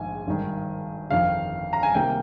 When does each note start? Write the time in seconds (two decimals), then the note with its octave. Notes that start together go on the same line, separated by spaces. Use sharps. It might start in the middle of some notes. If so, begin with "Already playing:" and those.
Already playing: A#1 G#2 D#3 G#5
0.27 G#1 G2 D#3
1.10 G1 F2 D#3 F5
1.73 A#5
1.83 G#5
1.95 C2 C3 D#3 A#3 G5